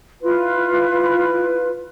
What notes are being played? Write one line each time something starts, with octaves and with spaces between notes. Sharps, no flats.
E4 F4 B4